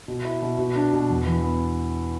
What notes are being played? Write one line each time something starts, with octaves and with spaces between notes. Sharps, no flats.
B2
E4
B2
B2
D4
B2
E2
E3
B3